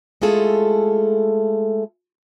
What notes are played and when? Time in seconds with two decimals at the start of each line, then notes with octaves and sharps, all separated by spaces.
0.22 G#3 A3 E4 F4 G#4 A4